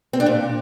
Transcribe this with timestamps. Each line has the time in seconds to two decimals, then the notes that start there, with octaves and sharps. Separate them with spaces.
0.13 C4
0.20 D4
0.26 A#2